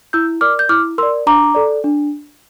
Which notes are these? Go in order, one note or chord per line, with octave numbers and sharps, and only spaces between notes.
E4 E6 G6
A#4 D5 D6 F6
G6
E4 D6 F6
A#4 D5 C6 E6
D4 A#5 D6
A4 D5
D4